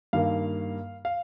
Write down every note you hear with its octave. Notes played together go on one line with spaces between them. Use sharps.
G2 D#3 A#3 F5
F5